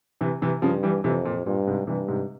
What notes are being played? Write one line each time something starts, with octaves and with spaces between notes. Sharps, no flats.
C3 E3
C3 E3
G2 C#3 F3
E3 G3
F2 C3 E3
A#2
G2 A#2
G#2 C3
G2 C3 E3
G#2 C3